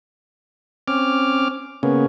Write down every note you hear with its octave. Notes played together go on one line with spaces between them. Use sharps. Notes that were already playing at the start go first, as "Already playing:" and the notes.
C4 C#4 D6 F6
C#3 A#3 B3 C#4